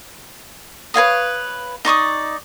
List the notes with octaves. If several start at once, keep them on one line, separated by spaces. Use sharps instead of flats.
B4 C#5 F5 D#6
D#4 D5 C#6 D#6